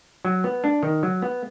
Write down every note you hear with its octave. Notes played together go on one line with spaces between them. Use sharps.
F#3
B3
D4
D#3
F#3
B3